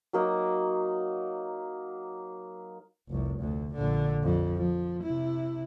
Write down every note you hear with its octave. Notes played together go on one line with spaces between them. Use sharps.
F#3 A#3 D#4
F1 C2
D2
A#1 D3
F2
F3
C3 E4